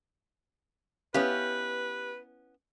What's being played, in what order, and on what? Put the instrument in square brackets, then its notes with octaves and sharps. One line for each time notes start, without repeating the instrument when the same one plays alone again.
[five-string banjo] B3 C#4 E4 [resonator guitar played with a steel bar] G4 F5 [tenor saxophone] B4